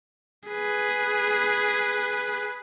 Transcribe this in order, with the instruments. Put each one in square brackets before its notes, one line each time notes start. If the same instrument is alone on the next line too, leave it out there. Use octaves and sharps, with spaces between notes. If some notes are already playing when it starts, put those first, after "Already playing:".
[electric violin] G#4 B4